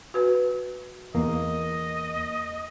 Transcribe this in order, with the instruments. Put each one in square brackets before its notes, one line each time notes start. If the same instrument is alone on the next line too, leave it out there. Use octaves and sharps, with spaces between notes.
[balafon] F#4 B4
[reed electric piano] E2 A#3 [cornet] D#5